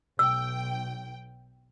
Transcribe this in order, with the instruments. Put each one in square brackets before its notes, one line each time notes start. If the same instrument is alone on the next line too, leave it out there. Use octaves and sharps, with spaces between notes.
[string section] B1 G5 [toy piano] E6